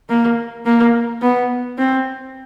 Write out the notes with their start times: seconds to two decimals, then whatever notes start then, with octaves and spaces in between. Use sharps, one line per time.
0.10 A#3
0.66 A#3
1.22 B3
1.78 C4